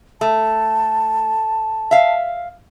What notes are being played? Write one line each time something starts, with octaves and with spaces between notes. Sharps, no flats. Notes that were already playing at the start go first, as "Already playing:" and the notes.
A3 A5
E5 F5